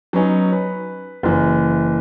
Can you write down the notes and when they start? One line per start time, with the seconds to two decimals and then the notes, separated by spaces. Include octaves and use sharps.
0.13 F#3 B3 C#4 D#4
0.52 B4
1.23 F#1 E3